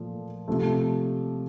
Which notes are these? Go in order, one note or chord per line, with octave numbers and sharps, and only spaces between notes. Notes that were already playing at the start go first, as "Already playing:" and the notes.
Already playing: A#2 F3 A3
C3 F3 A3